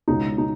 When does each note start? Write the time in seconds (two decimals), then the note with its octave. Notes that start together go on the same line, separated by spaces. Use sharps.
0.08 C#2 B2 G#3 C#4 D#4
0.38 D#4